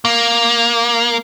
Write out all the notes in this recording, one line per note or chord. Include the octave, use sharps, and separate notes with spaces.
A#3